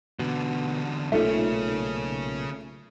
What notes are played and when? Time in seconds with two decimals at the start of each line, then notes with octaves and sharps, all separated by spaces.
0.19 E2 B2 D3
1.12 B1 A#2 C#3 A3 C#4 D#4 F4